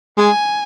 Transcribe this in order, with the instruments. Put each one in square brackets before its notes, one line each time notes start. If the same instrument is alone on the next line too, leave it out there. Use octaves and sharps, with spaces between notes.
[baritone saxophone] G#3 [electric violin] G#5